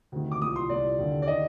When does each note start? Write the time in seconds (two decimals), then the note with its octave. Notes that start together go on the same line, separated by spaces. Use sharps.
0.12 D2 C3 D#3
0.32 D6
0.41 C2 A#2 D#6
0.56 C6
0.70 C2 A#2 D5
0.98 D#2 D3
1.22 D5
1.28 D#3 D#5